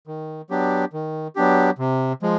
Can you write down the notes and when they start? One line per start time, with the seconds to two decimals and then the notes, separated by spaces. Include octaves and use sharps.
0.07 D#3
0.50 F#3 B3 D4 G4
0.93 D#3
1.36 F#3 B3 D4 G4
1.78 C3
2.22 F3 G#3